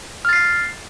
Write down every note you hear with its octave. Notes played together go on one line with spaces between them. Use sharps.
F6 A6 C7